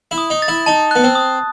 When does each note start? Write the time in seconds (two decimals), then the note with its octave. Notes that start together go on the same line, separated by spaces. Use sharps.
0.11 E4
0.18 D#6
0.30 D#4
0.42 A6
0.48 E4
0.66 D#4 A5
0.91 B3 F#6
1.04 C4
1.15 D#6